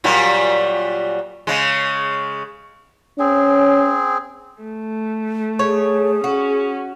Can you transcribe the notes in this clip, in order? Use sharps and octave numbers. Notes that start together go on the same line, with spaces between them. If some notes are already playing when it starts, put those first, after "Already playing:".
A#2 F#3 G3
C#3 G#3
C4 C#4 G#4
A3
G#4 C#5
C#4 F#4